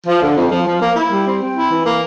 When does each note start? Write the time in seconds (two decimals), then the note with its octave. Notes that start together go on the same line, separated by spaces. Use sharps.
0.07 F3
0.22 D3
0.37 F2
0.51 F3
0.67 F3
0.81 A#3
0.96 E4
1.11 G3
1.26 C4
1.41 C4
1.55 E4
1.70 E3
1.86 A#3